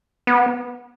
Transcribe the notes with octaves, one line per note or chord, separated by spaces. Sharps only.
B3